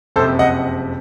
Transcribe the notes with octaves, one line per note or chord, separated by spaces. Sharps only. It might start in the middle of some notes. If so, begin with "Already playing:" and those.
F#1 F2 C3 A4 C5
D#5 F#5